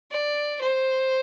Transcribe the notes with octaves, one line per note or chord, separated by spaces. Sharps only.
D5
C5